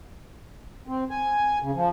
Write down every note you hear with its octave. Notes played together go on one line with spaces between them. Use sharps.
C4
G#5
C#3
F3